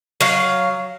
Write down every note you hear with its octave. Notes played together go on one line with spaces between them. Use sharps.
F#3 F5